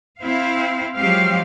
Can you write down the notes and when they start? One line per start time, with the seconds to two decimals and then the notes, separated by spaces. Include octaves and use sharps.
0.19 C4 E4 F5
0.96 F3 F#3 G#3 C4 G4 F5